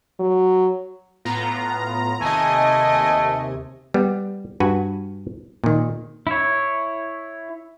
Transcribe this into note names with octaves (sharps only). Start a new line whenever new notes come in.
F#3
A2 B3 F4 A#5
D#2 C3 A3 D#5 G#5
G3 B3
G2 F#4 B4 G#5
A#2 D#3
E4 C#5